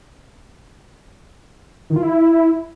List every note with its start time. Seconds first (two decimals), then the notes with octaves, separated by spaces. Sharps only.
1.90 D#3
1.96 F4
2.02 E4